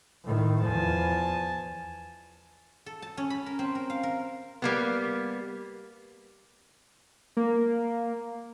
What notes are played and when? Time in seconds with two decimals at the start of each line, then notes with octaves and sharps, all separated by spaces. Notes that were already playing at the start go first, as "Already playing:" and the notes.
0.24 A2 D#3
0.62 E2 F3 G#5 A5
2.86 A4
3.02 A5
3.17 C#4
3.30 B5
3.46 A#4
3.59 C4
3.75 A#4
3.90 F5
4.03 A#4
4.62 G3 A#3 B3
7.37 A#3